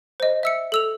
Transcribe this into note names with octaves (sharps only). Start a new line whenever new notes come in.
C5 D#5
E5 E6 C#7
A4 E6 F7